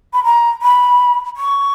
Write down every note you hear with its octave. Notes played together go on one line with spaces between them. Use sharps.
B5
A#5
B5
C#6